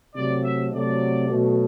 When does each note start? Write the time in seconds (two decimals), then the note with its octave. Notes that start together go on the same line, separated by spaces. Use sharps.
0.15 C3 F#3 A3 D5
0.43 E5
0.72 C3 F#3 A3 D5
1.28 B2 F#3 A3